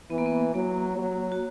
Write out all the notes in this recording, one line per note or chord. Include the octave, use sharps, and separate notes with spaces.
E3 B3
A#3
B3
A#3
F#3 A#3
F#3
F#4